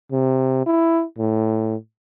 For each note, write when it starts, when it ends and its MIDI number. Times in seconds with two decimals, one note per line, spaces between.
0.12 0.64 48
0.66 1.03 64
1.18 1.76 45